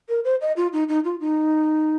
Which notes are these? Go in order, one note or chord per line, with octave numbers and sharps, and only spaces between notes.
A#4
C5
D#5
F4
D#4
D#4
F4
D#4